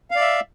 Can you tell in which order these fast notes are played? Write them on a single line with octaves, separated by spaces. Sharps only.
F5 D5 E5